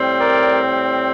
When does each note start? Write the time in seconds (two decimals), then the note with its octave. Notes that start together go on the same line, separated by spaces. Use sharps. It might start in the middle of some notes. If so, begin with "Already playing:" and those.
Already playing: A2 G3 C4
0.20 A#4 D5